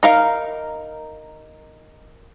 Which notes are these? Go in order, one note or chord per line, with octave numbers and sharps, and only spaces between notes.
D#4 A#4 F5